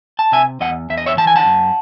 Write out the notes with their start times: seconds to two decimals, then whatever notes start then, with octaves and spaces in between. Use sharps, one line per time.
0.19 A5
0.32 C3 E5 G#5
0.60 E2 D#5 F#5
0.90 E2 E5
0.97 D#5
1.06 C#5 E5
1.17 E3 A5
1.27 G#5
1.36 F#5 A5
1.45 F#2